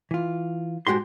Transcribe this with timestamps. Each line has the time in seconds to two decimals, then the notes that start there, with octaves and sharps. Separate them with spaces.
0.11 E3 F4
0.87 G#2 G#3 F#4 G4 C6